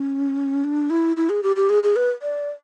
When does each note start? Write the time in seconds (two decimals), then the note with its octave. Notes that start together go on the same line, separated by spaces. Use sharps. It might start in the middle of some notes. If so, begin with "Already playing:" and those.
Already playing: C#4
0.64 D4
0.90 E4
1.17 E4
1.30 G#4
1.43 G4
1.56 G4
1.70 G#4
1.83 G#4
1.96 B4
2.22 D5